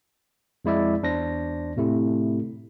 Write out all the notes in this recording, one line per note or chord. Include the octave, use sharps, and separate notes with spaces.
F2 G#3 E4 D5 E5
E2 D4 C5 A#6
A2 C3 A3 E4